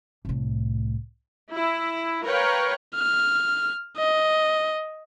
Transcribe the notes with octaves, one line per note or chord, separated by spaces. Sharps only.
C2 A2
E4
A#4 B4 C#5 F5 G5
F6
D#5